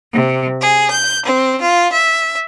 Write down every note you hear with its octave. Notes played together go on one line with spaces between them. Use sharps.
C3
G#4
G6
C4
F4
E5